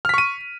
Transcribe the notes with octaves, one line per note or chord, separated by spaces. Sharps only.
C#6 F6 B6 D#7